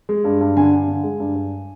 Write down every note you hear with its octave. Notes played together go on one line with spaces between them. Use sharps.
G#3
G2
G2
D3 G#5
G2
D3
G#3
G2
G2